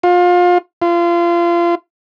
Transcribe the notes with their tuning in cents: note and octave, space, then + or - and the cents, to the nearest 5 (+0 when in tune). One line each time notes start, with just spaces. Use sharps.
F4 +25
F4 -30